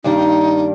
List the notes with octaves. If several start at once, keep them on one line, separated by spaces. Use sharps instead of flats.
G2 D#3 G3 A#3 D4 D#4